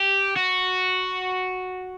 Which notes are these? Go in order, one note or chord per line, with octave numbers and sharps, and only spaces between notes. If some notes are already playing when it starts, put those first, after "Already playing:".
Already playing: G4
F#4